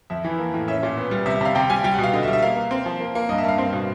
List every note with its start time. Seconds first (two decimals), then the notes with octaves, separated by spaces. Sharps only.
0.10 F2 E5
0.24 E3
0.39 A#3
0.54 A2
0.68 C#4 E5
0.83 A#2
0.97 B3
1.11 G3
1.26 C3 E5
1.36 E5
1.41 C3 F5
1.55 C3 G5
1.70 G3 G#5
1.84 G3 G5
1.94 F#5
1.98 B2
2.03 F5
2.13 D3 D#5
2.23 E5
2.28 G3
2.33 E5
2.42 A#3 F5
2.57 A#3
2.71 C4
2.86 F3
3.00 A#3
3.15 A#3
3.29 G2 D#5
3.38 E5
3.44 G2 F5
3.58 C4
3.73 B2